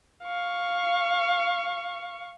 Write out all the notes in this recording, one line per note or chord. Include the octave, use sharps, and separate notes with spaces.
F5 C#6